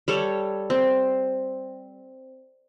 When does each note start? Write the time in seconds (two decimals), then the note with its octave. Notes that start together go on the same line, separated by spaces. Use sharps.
0.08 G3 A4 C#5
0.70 C4